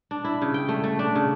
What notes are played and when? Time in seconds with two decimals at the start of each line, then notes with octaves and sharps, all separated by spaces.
0.11 D4
0.24 E4
0.42 C#3
0.54 G5
0.69 A3
0.84 A3
0.99 D4
1.15 C#3